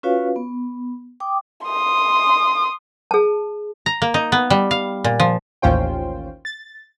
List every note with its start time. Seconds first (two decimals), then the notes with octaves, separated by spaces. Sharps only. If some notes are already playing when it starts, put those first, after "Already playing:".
0.03 C#4 F4 F#4 B4 C#5 F5
0.36 B3
1.20 G5 D6 D#6
1.65 C6 D#6
3.11 G#4 A5
3.86 A#5
4.02 A#3
4.14 D#4
4.32 B3
4.50 G3
4.71 F5
5.04 A#2
5.20 F3
5.62 A1 D#2 C#4 F4 C5 G5
6.45 A6